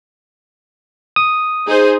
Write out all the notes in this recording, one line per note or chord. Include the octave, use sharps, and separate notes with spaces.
D#6
D#4 G#4 C5